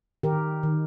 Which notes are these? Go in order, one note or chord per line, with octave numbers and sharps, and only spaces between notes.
D#3 G4 A#4
D#3